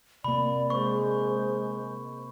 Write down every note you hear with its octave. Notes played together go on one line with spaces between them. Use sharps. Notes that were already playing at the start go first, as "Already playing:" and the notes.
C3 A#3 D5 B5
G#3 C5 C#6